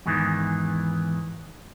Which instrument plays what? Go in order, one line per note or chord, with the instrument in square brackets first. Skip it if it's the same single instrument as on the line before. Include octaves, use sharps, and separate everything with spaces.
[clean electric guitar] E2 G#2 D#3 E3